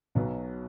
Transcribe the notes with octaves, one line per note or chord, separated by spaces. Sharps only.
B1 B2 F#3 B3